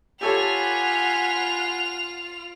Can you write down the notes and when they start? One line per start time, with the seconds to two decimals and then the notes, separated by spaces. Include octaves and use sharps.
0.21 F4 G4 A4 C#5 F#5 G#5 B5 F7